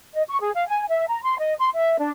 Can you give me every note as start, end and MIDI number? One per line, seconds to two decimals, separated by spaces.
0.14 0.22 75
0.28 0.39 85
0.41 0.51 68
0.55 0.66 77
0.68 0.87 80
0.89 1.05 76
1.08 1.21 82
1.22 1.37 84
1.39 1.55 75
1.59 1.69 84
1.75 1.98 76
1.99 2.10 62